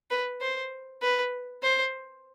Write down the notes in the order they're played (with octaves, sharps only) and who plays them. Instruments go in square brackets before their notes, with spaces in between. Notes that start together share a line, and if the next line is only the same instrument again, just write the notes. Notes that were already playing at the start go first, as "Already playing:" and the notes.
[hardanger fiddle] B4
C5
B4
C5